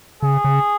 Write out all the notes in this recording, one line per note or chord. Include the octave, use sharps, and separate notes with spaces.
C#3 G#4
C#3